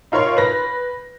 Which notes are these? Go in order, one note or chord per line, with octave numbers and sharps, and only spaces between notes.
D#4 F4 A#4 C#5 C6
B4 A#6